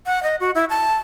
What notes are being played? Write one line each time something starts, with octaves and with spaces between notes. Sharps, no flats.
F#5
D#5
F#4
E4
A5